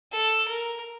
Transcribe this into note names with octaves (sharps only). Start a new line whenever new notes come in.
A4
A#4